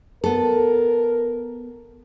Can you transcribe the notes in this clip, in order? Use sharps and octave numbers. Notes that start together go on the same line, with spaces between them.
B3 A4 A#4